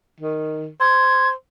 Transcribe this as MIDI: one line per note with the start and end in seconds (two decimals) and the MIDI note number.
0.20 0.68 51
0.81 1.31 72
0.81 1.29 92